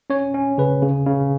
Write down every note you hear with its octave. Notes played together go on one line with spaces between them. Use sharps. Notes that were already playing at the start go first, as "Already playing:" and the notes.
C#4 C#5
C#4
C#3 B4
C#3
C#3